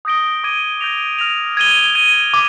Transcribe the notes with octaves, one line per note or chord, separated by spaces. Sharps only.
D#6 G6 A#6 D7 G7
D6 G#6 D#7 G7
G6 A#6 D7 F7
F6 A#6 F7
G#6 D#7 G7
G#6 D#7 G7
D6